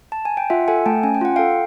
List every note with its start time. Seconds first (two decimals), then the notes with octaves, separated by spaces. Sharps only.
0.12 A5
0.25 G#5
0.37 G5
0.50 F4 E5 F#5
0.68 A4 F#5 G#5
0.86 A3 G5 A5
1.03 C#4 G#5
1.15 G5
1.21 F4 F#5
1.36 A4 F5 G5